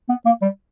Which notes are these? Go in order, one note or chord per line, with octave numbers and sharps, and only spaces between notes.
B3
A#3
G3